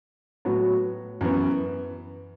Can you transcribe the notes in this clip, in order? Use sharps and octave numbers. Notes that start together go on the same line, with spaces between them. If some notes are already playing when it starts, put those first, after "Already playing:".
A2 F#3 B3 F#4
F#2 E3 B3